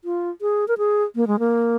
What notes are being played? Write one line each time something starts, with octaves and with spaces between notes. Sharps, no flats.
F4
G#4
A#4
G#4
A#3
G#3
A#3